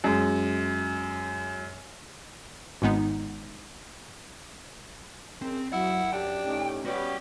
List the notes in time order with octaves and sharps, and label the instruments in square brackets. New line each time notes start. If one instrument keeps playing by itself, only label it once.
[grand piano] F#2 G#3
[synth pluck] G#1 G#2 G#3 B3 D#4
[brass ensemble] C#3 G#3 A#4 [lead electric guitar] C4
[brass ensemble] F#2 [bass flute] F#3 [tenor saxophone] E4 [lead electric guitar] F#5
[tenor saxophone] D4 [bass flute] G4 [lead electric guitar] G5
[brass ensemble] A2 C#4 D#4
[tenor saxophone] G3 [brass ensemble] B3 C#4 C#5 [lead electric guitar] F#4 G5